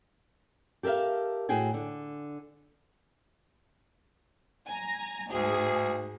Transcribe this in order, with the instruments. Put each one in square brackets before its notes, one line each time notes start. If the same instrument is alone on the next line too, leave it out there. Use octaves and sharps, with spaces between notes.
[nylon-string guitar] G4 A4 A#4 E5 F5
A2 F#4 G#4 G5 G#5
D3
[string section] G#5 A#5
[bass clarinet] D2 [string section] G#2 G#4